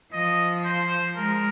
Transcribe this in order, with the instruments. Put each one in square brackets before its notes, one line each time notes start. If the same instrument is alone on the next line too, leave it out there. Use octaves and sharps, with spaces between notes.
[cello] F3 [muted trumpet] D#5
[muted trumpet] C5
[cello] G#3 [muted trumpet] A#4